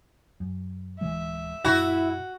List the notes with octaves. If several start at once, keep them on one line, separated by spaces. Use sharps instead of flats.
F#2
D1 E3 G#3 E5
F#2 A#2 E4 F#4